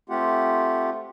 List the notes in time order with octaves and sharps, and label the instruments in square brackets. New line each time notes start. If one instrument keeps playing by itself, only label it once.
[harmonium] A3 C4 F4 G4 F#5